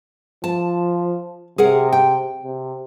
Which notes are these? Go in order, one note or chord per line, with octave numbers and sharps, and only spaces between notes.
F3 A5
C3 G#4 A#4 F#5
G5
C3